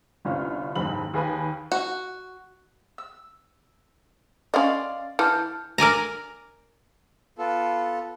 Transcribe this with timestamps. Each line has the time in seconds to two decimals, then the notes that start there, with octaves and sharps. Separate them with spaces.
0.25 G1 C2 C#4 F4 F6
0.75 F#1 D#2 G#2 B5 F#7
1.14 D#2 G#4 B4 G#5 B5
1.72 F#4
2.98 E6
4.54 C#4 D5 D#5 F5 C6
5.19 E3 A5 F6 G6
5.78 A#4 D5 G#5 A#5
7.38 B3 F4 A4